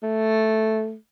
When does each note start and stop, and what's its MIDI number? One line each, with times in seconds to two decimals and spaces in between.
0.03 0.95 57